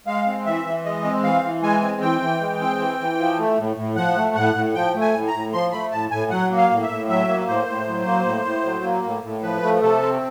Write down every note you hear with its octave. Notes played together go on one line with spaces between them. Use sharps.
G#3 F5
C4
E3 E5
E3
G#3 D#5
C4
E3 F5
E3
G#3 G#5
C4
E3 G5
E3
G#3
C4
E3
E3
F3
A3
A2
A2
F3 F#5
A3
A2 F#5
A2
F3 G5
A3
G#5
A2
A#5
A2
F3 C6
A3 B5
A2 A5
A2 G#5
F#3 F#5
A#3
F5
A2
E5
A2
F#3 E5
A#3
A2 C5
A2
F#3
A#3
A2
A2
F#3
A#3
A2
A2
F3 B4
A3
C3 A4
C4